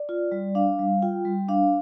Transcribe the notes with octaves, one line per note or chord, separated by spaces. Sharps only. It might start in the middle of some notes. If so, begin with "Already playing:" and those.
Already playing: D5
F4
G3
D4 F5
G3
F4 G5
G3
D4 F5